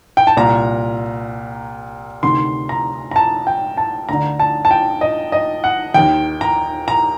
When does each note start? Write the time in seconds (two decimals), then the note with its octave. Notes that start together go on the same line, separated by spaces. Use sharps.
0.17 G5
0.27 A5
0.37 C2 A#2 A#5
2.23 D2 C3 D#3 C6
2.69 A#5
3.11 A#5
3.16 A5
3.47 G5
3.77 A5
4.09 D2 D3 A#5
4.40 A5
4.65 A5
4.71 G5
5.01 D#5
5.32 D#5
5.64 F#5
5.94 D#2 D#3 G5
6.41 A#5
6.88 A#5